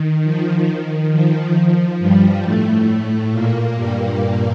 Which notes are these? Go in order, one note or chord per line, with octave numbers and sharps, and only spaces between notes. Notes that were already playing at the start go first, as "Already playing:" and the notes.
Already playing: D#3
F3
D#3
F3
F3
G2 G3
A2 A3
A#2 A#3
G2 G3